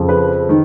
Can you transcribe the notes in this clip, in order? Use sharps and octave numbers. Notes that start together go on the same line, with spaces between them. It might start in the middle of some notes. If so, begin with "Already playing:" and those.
Already playing: F2 C#3 F3
B4
D#3